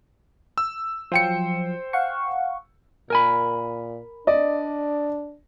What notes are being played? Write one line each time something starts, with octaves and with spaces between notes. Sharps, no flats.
E6
F3 F#3 C5 G5 C#7
F5 F#5 C#6
A#2 A#4 G#5 B5
D4 D5 D#5